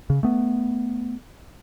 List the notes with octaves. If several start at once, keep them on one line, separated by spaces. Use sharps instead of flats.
C#3
A3 B3